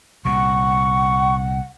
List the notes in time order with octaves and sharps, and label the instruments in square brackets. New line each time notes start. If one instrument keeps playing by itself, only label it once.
[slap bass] C2 A#2 [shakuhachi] F#5 [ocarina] C#6